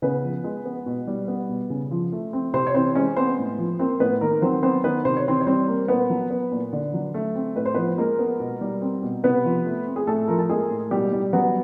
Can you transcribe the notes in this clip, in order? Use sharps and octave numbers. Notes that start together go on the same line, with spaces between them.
C#3 B3 B4
F3
G#3
B3
B2
G3
B3
B2
C#3
F3
A3
C4
C3 C4 C5
C#5
E3 C4 C5
G#3 C#4 C#5
B3 C4 C5
A2
F3
A#3 C4 C5
A2 B3 B4
D#3 A#3 A#4
F#3 C4 C5
B3 C4 C5
D#3 B3 B4
C3 C5
C#5
E3 C4 C5
C#5
G3 C4 C5
A#3
A#2 B3 B4
F#3
B3
A#2
D3
F#3
A3
C4
A2 B4
C5
F3 B3 B4
G#3 A#3 A#4
B3
B2
G3
C4
B2
C3 B3 B4
F3
A3
C4
G#4
A2 A3 A4
F3 A#4
A4
G#3 A#3 G#4
A2
B2 G3 G4
G3
F#3 B3 F#4